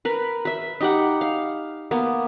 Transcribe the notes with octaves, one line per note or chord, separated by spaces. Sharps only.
A#4 B4
B4 E5
D#4 G4 F#5
F5
A#3 B3